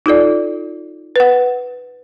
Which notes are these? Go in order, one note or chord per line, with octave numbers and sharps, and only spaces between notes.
D#4 F4 A4 D5
B4 F#5